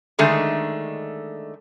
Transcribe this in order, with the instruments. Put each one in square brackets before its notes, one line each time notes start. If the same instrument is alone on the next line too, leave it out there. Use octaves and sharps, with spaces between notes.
[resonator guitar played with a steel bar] D3 D#3 G#3 A3